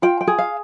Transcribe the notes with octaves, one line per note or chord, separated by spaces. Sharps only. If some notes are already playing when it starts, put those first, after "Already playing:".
F4 G5
G5
G#4
F5